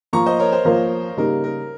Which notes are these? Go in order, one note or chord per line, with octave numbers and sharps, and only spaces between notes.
F3 A#3 F4 A#5 C#6
C5 D#5
A#4 C#5
C5
F3 A#3 F4 A#4
C#3 G3 A#3 D#4 A#4
A#4